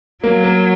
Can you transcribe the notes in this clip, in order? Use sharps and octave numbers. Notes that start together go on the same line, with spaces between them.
F#3 A#3
A#3